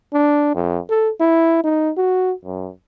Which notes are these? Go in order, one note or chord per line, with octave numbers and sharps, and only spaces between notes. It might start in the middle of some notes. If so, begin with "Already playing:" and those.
D4
F2
A4
E4
D#4
F#4
F#2